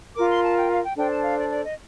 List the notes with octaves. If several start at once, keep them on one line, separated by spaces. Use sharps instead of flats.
F4 A#4 D6
C6
A5
G5
F5
G5
D4 A4 C5 G5
A5
F5
D5
D5
D#5